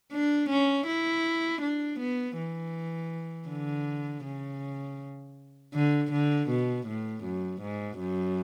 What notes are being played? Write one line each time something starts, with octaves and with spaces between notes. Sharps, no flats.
D4
C#4
E4
D4
B3
E3
D3
C#3
D3
D3
B2
A2
F#2
G#2
F#2